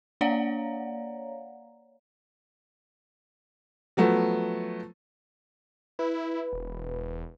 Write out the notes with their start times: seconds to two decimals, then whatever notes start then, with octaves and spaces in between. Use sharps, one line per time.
0.21 A#3 C#5 D5 F5 F#5 A#5
3.97 F3 F#3 A3 B3
5.99 E4 B4
6.53 E1